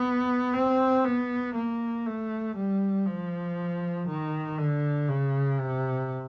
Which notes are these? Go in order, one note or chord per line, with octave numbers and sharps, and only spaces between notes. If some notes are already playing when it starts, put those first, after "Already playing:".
Already playing: B3
C4
B3
A#3
A3
G3
F3
D#3
D3
C#3
C3